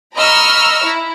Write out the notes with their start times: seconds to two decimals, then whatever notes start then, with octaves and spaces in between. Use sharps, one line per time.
0.17 D#5 A#5 B5 C#6 E6 F6
0.83 E4